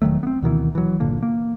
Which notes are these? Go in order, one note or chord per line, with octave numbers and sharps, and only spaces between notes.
E1 D#3 F#3 A3
B3 C4
D2 B2 D#3 E3
E3 F#3
G1 A#2 D3 A#3
A#3